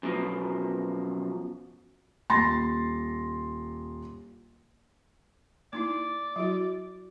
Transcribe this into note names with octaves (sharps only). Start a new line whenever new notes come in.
F#2 B2 F3
D#1 C6 A6 A#6
A#3 D#4 E4 D5
F#3 E4 F#4